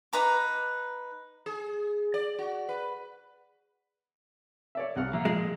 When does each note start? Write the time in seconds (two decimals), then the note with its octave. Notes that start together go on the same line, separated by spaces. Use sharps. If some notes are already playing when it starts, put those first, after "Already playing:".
0.13 D#4 B4 A#5 D6
1.46 G#4
2.14 D5
2.38 F#4
2.69 B4
4.75 C#5 D5 E5
4.96 C2 F#5 F6
5.13 F3 A#3 F4 E5 A#5
5.25 A#2 G#3